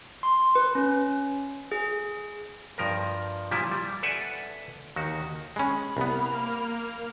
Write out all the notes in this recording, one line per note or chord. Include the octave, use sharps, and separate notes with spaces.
C6
B4
C#4
G#4
G2 F3 A#4
A#2 F3 G3 E4
G3
A4 B4 D5 E5 F#5 G#5
D#2 D#3 F#4
G#3 C#4 B5
C2 A#3 B3 F6